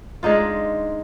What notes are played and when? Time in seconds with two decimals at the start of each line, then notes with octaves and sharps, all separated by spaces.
0.23 G#3 D4 D#4 F4